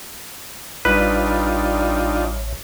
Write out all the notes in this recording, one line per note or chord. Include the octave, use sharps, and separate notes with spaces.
A1 G3 D4 D#4 F4 B4